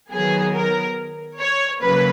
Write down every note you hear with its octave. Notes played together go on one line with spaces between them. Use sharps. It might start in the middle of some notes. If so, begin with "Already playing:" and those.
D#3 F#3 B3 G#4
A#4
C#5
C#3 F#3 A#3 B4